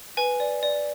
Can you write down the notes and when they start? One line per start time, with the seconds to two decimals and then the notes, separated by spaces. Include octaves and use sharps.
0.17 B4 G#5
0.40 D5
0.63 D5